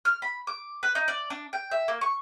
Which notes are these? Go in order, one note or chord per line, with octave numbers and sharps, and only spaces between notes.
F6
B5
D6
B4
D#4
D5
D4
G5
E5
A#3
C#6